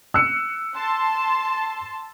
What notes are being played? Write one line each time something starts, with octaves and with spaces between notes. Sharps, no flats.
E6 F#6 C#7
A5 C6